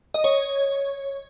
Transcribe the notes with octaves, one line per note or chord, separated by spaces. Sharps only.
D#5
C#5